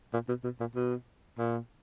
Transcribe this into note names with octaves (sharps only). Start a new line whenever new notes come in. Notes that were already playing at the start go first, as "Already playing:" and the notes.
A#2
B2
B2
A#2
B2
A#2